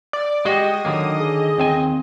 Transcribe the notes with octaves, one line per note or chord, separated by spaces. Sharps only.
D5
G#3 F#4 G4 D#5
D3 D#3 F#3 A#3
G#4
D#2 C4 G#5